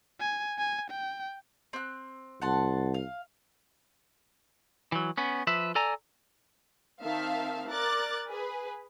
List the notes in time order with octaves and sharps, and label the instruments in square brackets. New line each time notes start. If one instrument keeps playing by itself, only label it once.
[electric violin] G#5
G#5
G5
[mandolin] C4 F#6
[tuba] C2 [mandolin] F#5 A5 C6
[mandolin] F5
[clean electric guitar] E3 F#3
B3 C#4
F3 B4 E5
A4 D5 G#5 A#5
[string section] D#3 C4 E5 F5 A5
A#4 D5 A#5 D6 F#6 A6
G#4 B4